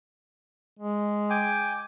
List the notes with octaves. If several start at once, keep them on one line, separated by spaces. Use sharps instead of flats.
G#3
G5 G#5 D6